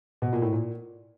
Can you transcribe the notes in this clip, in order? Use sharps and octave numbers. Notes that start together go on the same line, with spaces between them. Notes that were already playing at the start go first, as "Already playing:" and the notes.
B2
A#2
A2
A#2